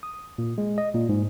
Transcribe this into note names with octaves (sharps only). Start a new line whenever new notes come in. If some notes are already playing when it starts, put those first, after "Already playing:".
D#6
A#2
G#3
D#5
A#2
G#2